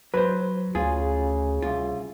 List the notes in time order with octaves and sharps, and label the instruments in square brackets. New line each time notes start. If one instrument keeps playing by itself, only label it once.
[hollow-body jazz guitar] F#3 [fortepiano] B4 C5
[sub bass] D2 [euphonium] C#3 [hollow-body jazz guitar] F4 [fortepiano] G#4
[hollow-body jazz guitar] C2 F4